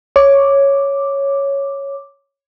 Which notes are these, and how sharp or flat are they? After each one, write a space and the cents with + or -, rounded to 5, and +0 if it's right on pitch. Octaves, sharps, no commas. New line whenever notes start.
C#5 +0 D6 +0